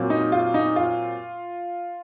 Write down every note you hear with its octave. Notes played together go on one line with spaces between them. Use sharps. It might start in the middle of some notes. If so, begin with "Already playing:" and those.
Already playing: A#2 F#3 C4
D#4
F4
D#4
F4